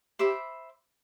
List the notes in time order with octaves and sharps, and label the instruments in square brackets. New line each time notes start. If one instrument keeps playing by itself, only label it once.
[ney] G4 [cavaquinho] C5 E5 B5 D6